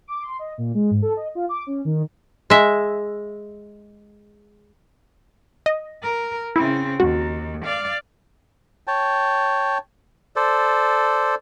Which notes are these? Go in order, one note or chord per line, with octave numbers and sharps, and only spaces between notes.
D6
C6
D#5
A#2
G#3
G#2
A4
D#5
F4
D6
C#4
D#3
G#3 E5
D#5
A#4
C#3 C4 E4
D#2 F#4
D5 F5
C#5 G5 A5
A4 C5 D5